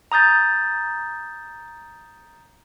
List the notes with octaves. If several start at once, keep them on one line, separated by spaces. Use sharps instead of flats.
A#5 D#6 G6 A6